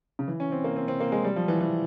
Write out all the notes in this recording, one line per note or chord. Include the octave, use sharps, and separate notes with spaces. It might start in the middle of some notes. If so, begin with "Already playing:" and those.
C#3
E3
C#4
C4
A#3
C4
C4
A#3
G#3
G3
F3
E3
E3